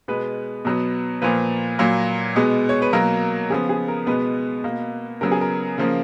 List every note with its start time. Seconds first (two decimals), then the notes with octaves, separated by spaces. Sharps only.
0.08 B2 G#3 B3 B4
0.65 B2 F#3 B3
1.22 A#2 F3 A#3 B4
1.79 A#2 F#3 A#3
2.36 B2 G#3 B3
2.69 C#5
2.82 B4
2.93 B2 F#3 A#3 A#4
3.50 C#3 F3 B3 G#4
3.69 G#4
3.88 A#4
4.06 B2 G#3 B3 B4
4.64 B2 A#3
5.21 C#3 F#3 B3 A#4
5.31 G#4
5.41 A#4
5.78 C#3 F3 A#3